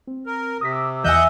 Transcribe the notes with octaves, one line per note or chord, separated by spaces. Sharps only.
C4
A#4
C3 D#6 A#6 B6
D6 E6
E2 E3 D#5 E5 F#5 G#5 G6